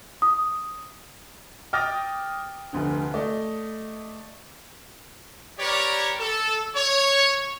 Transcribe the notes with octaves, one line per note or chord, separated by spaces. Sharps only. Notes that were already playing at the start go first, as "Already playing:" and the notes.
D#6
G5 D6 D#6 F6 A6 A#6
F1 D2 D3
A3 D5 D#5
G4 A#4 B4 C#5 D5
A4
C#5